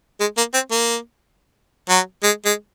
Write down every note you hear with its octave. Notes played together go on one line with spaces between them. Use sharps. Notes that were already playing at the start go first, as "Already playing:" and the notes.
G#3
A#3
C4
A#3
F#3
G#3
G#3